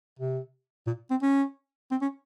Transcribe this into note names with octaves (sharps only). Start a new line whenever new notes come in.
C3
A#2
C4
C#4
C4
C#4